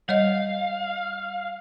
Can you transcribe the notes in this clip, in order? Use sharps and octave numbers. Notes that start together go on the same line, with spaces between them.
G3 C#5 D#5 F5